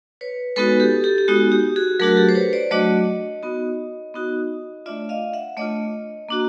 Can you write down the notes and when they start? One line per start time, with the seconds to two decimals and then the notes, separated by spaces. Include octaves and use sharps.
0.21 B4 C#5
0.56 G#3 B3 D#4 F#4 A4 B4
0.80 G4 A4
1.04 G4 A4
1.18 G4
1.28 G#3 B3 D#4 F#4
1.52 G4
1.76 F#4 G#4
2.00 F#3 A3 D4 F#4 G#4 A#4
2.17 G4 A4
2.29 C5
2.35 B4 C#5
2.53 C5 D5
2.71 F#3 A3 D4 F#4 C#5 D#5
3.43 B3 D#4 F#4
4.14 B3 D#4 F#4
4.86 A3 D4 F4 D5 E5
5.09 D#5 F5
5.33 E5 F#5
5.57 A3 D4 F4 C#5 D#5
6.29 A#3 D4 F#4